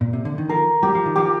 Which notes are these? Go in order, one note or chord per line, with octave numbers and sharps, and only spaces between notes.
A#2
C3
D3
D#3
F3 A#4
G3 G4
F3
D#3
F3 G4